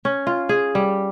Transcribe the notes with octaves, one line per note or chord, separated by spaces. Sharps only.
C#4
F4
G#4
G3